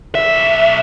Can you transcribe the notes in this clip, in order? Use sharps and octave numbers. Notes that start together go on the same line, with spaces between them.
B1 E5